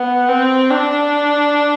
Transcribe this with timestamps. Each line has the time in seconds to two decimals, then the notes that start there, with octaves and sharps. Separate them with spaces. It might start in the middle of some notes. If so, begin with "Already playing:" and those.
Already playing: B3
0.29 C4
0.70 D4